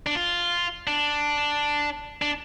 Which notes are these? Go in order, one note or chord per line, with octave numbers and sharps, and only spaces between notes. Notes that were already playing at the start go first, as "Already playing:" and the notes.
D4
F4
D4
D4